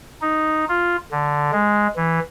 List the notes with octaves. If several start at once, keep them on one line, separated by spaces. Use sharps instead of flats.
D#4
F4
D3
G#3
E3